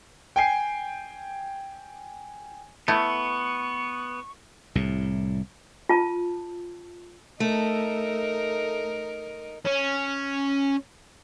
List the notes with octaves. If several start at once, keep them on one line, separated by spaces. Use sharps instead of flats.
G5 G#5 C7
A3 B3 E4 C#6
C2 A2
F4 A5
A3 D#4 A#4
C#4